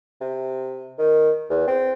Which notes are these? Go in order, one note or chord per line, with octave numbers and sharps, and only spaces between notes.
C3
D#3
E2
C4